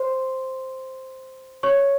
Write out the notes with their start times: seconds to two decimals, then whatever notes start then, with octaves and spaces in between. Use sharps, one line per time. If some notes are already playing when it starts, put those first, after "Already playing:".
Already playing: C5 C6
1.63 C#5 C#6